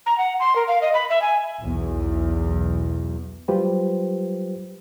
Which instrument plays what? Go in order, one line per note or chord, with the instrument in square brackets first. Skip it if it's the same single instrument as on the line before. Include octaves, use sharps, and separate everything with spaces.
[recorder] A#5
F#5
C6
A#4
F5
D#5
B5
E5
G#5
[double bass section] B1 E2
[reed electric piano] F#3 G3 F4 G4 B4 C5